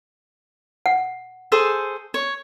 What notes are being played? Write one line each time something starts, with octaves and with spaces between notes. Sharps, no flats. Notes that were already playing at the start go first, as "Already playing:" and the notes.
F#5
G#4 A4 C5
C#5